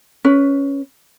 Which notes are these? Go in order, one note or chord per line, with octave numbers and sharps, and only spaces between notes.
C#4 B4